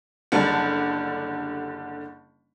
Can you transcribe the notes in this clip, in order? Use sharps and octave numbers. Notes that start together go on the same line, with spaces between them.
F#1 D3 G3 A5 F#6